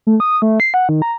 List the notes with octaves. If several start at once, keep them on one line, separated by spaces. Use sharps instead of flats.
A3
D#6
A3
C7
F#5
D#3
A#5